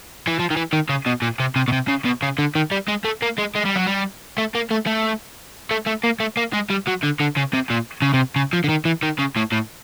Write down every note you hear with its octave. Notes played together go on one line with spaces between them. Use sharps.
E3
F3
D#3
E3
D#3
C#3
B2
A#2
C3
C3
B2
C3
C#3
B2
C#3
D3
D#3
G3
G#3
A3
A#3
G#3
G#3
G3
F#3
G3
A3
A#3
A3
A3
A3
A3
A#3
A3
A#3
G#3
G3
F#3
D3
D3
C#3
C3
A#2
C#3
C3
C#3
F3
D3
D#3
E3
D#3
C#3
A2
A2